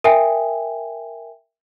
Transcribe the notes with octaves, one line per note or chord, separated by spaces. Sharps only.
A#4 E5 G5 G#5